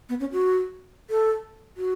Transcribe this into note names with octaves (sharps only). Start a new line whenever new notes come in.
B3
C#4
F#4
A4
F#4